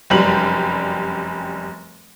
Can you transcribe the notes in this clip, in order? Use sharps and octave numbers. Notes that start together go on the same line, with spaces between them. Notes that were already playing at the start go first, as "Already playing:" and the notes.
F1 F#2 G3 F#7